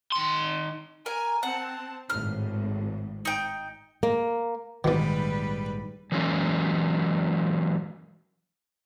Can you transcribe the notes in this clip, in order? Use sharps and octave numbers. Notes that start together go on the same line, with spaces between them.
D#3 C6
A#4 G#5
C4 F#5 A5
G#1 A2 F6
D#4 G5
A#3
A#1 G#2 B2 D#3 E3 G3 B4
E3 F#3 G#3 A#3 C#4